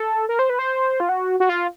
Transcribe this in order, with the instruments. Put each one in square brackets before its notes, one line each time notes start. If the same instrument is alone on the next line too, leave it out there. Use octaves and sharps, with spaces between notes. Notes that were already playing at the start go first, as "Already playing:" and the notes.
Already playing: [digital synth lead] A4
A#4
C5
B4
C5
F4
F#4
F#4
F4